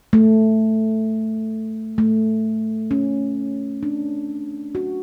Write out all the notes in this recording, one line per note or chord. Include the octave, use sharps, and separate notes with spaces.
A3
A3
C#4
D4
F#4